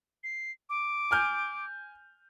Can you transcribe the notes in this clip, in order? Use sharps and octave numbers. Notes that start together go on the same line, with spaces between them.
C7
D6
G#5 F6 G6